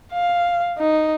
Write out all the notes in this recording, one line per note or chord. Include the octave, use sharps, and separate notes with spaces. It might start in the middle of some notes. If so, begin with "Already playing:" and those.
F5
D#4